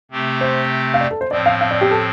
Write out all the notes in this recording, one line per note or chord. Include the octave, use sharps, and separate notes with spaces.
C3 A3 C4 G4
C5
F5
D5
A4
C5
A2 F3 C4 D5
F5
F5
D5
G4
A4